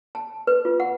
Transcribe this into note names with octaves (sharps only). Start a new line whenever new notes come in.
A5
B4
F4
F#5